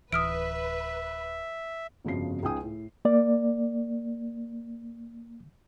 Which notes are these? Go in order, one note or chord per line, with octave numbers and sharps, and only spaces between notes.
D1 E3 B4 E5 D#6 F6 D7
G1 F2 C#3 F3 F#4 C7
C#2 C#3 D#4 G5 G#5 D#6
A2
A#3 D5